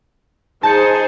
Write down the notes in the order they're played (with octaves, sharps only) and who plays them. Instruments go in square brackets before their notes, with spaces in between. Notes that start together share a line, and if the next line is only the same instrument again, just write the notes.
[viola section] D#4 G#4 C5 [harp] A5 G6 C#7